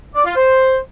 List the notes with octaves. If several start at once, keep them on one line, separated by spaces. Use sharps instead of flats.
D5
F4
C5